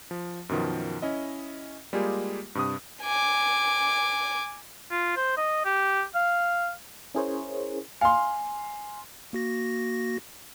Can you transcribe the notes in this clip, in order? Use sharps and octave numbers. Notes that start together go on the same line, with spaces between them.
F3
F#2 B2 D#3 F3
C#4 E4 D#5
G3 G#3 A#3 F4 G4 G#4
G2 C3 D#6
G#5 D6
F4
C5
D#5
G4
F5
C#4 E4 G#4 A#4 C5 C#5
F5 G#5 C6
A#3 F#4 A#6